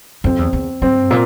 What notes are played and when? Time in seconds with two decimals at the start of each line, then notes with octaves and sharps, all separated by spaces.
0.24 F2 C4
0.39 E2
0.53 E2
0.82 G2 C4
1.10 A#2